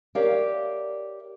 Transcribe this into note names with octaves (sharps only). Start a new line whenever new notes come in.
G4 A#4 C#5 D5 E5 F5